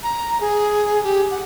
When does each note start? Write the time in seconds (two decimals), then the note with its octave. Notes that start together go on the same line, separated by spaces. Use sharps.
0.03 A#5
0.41 G#4
1.04 G4
1.31 F#5